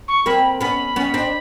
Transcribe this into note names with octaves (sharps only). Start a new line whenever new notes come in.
C#6
A#3 C4 B5
B3 C#4 B5
B3 C#4
C4 D4